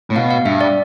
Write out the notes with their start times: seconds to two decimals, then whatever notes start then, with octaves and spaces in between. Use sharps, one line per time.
0.10 A2
0.16 B2 F5
0.31 F5
0.45 G2 E5
0.61 D5